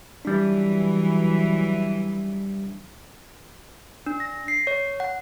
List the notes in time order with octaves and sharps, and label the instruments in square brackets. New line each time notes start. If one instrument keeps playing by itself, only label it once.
[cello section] E3 F#3 [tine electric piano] G3 D4
[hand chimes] D4
A#6
C7
C#5
F#5